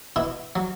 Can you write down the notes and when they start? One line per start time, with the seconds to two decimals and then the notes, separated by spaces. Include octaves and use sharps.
0.16 B2 E4
0.56 F#3